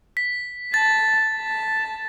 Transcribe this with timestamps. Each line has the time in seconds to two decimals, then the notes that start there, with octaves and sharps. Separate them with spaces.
0.17 B6
0.74 A5 A6
1.34 A5